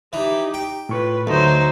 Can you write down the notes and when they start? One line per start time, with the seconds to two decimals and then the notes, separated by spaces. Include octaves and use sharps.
0.13 E3 D#4 G4
0.54 G5
0.89 A2 F4 B4 C#6
1.27 D2 F#3 A3 D#4 C5